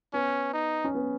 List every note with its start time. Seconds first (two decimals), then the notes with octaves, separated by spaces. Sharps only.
0.13 B3 C#4
0.53 D#4
0.84 C#4
0.95 B3